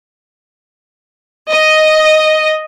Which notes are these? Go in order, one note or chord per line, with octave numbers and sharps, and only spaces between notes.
D#5